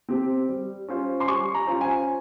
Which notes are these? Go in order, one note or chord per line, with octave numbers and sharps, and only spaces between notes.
C4 G4 C5
G3
C#4 F4 C5
C6
G3 C#6
A#5
C#4 F4 C5
G#5